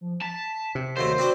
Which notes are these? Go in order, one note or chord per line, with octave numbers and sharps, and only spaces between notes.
F3
A5 B6
C3
D#2 F#3 A3 C5
C4 D4 F#4 B4